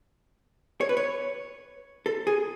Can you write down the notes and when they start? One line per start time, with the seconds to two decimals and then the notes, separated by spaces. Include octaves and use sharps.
0.81 C#5
0.89 B4
0.97 C#5
2.06 A4
2.27 G#4